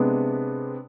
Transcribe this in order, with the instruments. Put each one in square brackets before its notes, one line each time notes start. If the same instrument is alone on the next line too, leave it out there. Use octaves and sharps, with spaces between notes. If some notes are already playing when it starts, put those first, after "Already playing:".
Already playing: [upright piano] C3 G#3 B3 D4